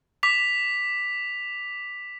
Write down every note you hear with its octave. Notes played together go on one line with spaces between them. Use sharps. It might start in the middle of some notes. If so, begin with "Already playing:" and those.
D6 B6 F7